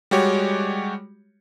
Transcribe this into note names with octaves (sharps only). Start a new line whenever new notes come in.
G3 G#3 F#4 G4 C#5